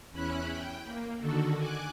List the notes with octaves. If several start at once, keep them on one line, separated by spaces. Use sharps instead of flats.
E2 C#4 E4 B5 F#6
G5
A#3
D3 D#3 F#4 A4
G#5 D6 F#6